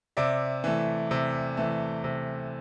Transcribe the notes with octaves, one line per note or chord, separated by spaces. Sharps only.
C3 D5 E5
E3 A3
C3
E3 A3
C3